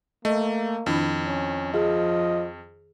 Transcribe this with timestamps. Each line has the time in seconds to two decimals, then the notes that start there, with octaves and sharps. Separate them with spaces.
0.25 A3 A#3 D#5
0.86 F2 D#3 D4 E4
1.27 C#4
1.74 F3 G#4 D#5